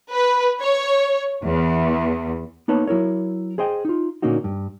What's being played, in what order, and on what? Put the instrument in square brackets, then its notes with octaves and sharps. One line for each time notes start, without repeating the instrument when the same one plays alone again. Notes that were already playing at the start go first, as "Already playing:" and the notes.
[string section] B4
C#5
E2
[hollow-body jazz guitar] A#3 B3 D#4 B4 C#5 A5
F#3 E4 A#4 C#5
G#4 C5 D#5 G5
D#4 F4
A#2 D3 A#3 C#4 D#4 F#4
G2